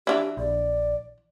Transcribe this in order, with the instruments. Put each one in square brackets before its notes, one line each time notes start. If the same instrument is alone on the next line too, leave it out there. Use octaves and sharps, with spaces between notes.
[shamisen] E3 D4 E4 [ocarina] G4
[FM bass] A#1 [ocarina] D5